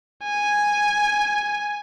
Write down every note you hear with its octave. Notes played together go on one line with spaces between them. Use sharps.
G#5